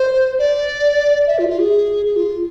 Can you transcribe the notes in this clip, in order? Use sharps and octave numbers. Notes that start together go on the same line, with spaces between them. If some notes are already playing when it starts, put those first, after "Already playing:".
Already playing: C5
D5
E5
F4
F4
G#4
G#4
F4